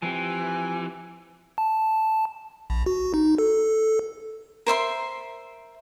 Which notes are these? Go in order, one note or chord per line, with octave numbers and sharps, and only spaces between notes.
E3 F3 C4 G4 G#5
A5
A#1
F#4
D#4
A4
A#4 C5 E5 C6